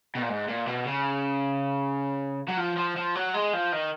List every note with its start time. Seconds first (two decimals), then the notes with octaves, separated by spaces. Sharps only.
0.15 B2
0.22 A#2
0.29 G#2
0.48 A#2
0.67 B2
0.87 C#3
2.49 F#3
2.58 F3
2.77 F3
2.96 F3
3.15 F#3
3.34 G#3
3.54 F3
3.73 D#3